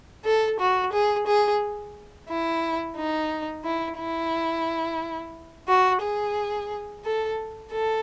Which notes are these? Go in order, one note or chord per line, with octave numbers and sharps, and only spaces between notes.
A4
F#4
G#4
G#4
E4
D#4
E4
E4
F#4
G#4
A4
A4